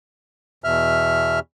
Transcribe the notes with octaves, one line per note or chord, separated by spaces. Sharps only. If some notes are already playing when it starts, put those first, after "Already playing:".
E2 B2 E5 F6